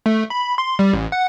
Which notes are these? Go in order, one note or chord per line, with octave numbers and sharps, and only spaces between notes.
A3
B5
C6
G3
A1
F#5